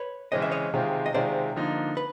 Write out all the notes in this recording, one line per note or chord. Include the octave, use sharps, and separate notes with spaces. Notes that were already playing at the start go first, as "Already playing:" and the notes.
Already playing: B4 C#5
C#3 E3 G#3 C4 D#5
E5
C#5 D#5
C3 D#3 G#3 C4 F4
D#5
C3 D#3 G#3 C4 F4 C5 D5
D3 F3 A#3 D#4
B4